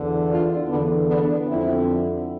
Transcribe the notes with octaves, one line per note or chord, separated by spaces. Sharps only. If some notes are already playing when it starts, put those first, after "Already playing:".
Already playing: E2 D3
D4 F4
E2 D3 B3 D4
B3 D4
F2 D3 C4 E4